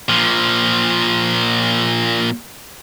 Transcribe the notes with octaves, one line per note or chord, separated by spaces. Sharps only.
A#2 F3